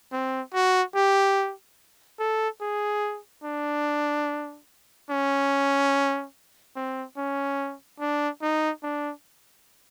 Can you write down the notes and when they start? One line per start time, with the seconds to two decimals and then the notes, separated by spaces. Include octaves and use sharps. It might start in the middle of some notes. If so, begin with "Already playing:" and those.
0.12 C4
0.54 F#4
0.95 G4
2.19 A4
2.61 G#4
3.44 D4
5.10 C#4
6.76 C4
7.17 C#4
8.00 D4
8.42 D#4
8.83 D4